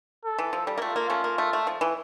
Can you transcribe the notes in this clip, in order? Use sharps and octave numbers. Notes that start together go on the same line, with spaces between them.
A4
E3
F3
G3
A#3
A3 F4
A#3
A3 C#4
A#3
A3
A3
F3
E3